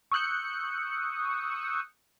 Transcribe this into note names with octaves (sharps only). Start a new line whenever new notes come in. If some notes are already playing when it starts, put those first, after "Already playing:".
C#6 D#6 E6 F#6 G6 C#7